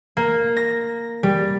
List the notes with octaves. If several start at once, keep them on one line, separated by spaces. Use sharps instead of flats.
A#3
A#6
G3